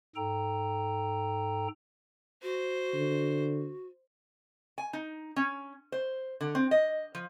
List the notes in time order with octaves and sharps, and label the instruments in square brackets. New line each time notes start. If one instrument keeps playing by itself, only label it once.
[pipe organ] G#2 A4 G5 A#5
[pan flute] F#4 [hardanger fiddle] C5
[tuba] D3
[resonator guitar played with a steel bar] G#5
D#4
C#4
C5
D3
C4
D#5
F3